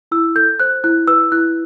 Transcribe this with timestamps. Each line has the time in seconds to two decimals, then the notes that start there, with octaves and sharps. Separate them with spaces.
0.11 E4 E6
0.36 A4 G6
0.60 C5 F#6
0.84 E4 F#6
1.07 B4 E6
1.32 E4 F#6